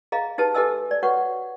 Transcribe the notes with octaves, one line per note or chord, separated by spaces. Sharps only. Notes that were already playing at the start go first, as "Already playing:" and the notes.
G#4 D#5 F5 A#5
D#4 G4 G#4 B4 A5
G4 A4 B4 D#5 G#5 E6
D5
F#4 B4 C#5 F#5 C#6